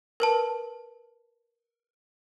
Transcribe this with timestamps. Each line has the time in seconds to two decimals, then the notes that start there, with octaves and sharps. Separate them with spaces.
0.20 A#4 B4 A5